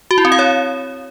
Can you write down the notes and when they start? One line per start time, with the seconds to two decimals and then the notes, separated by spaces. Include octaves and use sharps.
0.11 F#4
0.18 E4
0.25 C4
0.32 F5
0.39 C#5